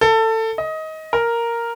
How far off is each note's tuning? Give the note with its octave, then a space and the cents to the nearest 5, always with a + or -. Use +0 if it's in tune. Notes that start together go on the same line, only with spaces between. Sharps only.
A4 +20
D#5 +20
A#4 +0